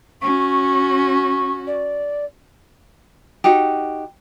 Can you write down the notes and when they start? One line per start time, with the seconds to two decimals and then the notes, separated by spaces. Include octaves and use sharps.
0.22 C#4 F#4 C#6
1.67 D5
3.44 D#4 F#4 G4